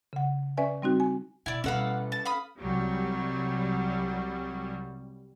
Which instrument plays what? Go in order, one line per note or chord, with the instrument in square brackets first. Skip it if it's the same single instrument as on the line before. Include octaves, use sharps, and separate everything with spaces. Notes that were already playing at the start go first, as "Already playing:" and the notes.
[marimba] C#3 F#5
C#4 B4 D5 E5 G#5
G3 C4 D#4 F#4
G#5
[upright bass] B2 [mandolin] E4 D5
[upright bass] B2 G3 [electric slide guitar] C#4 A4 B4 [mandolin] F5 F#5 E6
[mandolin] A5
F5 B5 D#6
[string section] C2 F#3 G3